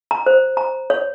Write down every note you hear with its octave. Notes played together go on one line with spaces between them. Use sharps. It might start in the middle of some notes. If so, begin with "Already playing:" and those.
A#5
C5
A#5
C#5